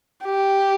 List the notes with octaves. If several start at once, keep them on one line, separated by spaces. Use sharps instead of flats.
G4